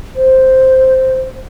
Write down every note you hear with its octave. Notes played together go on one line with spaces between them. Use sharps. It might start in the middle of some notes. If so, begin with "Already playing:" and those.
C5